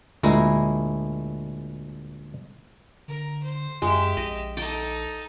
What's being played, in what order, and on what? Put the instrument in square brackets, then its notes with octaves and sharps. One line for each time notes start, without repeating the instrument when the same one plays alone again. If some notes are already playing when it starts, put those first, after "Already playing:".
[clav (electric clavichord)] D2 A#2 G#3 E4 A#5
[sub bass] D3 [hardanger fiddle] A#4
[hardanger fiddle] C5
[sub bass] F#2 [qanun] G#3 [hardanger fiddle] G4 E5
[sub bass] A#1 [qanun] D#5
[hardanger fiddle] D#4 A4 [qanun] D5 G5